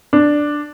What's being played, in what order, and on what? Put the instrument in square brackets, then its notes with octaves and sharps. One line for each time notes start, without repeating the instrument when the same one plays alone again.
[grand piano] D4